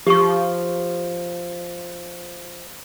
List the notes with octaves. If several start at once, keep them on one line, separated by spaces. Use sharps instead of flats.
F3 G4 C#6